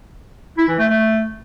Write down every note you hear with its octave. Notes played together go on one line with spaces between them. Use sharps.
E4
E3
A3
A3